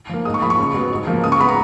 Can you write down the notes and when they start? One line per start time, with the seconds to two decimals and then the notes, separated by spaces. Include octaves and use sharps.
0.09 F3 A#3
0.25 G#2 D#6
0.34 C#6
0.42 F3 A#3 B5
0.50 C#6
0.59 C#3
0.74 F#3 B3
0.91 G#2
1.07 F3 A#3
1.24 C#3 D#6
1.32 C#6
1.40 G#3 B3 B5
1.49 A#5